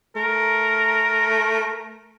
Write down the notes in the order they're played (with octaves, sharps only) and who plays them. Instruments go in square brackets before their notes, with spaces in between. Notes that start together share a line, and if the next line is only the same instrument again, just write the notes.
[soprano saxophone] A3 [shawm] A#4